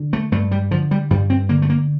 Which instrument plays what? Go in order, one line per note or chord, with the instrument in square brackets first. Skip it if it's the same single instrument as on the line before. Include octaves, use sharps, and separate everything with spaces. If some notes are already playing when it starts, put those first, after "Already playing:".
Already playing: [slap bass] D3
A3
G2 A3
G3
D3 F3
G3
G2 G3
C4
D3 A#3
A3
A#3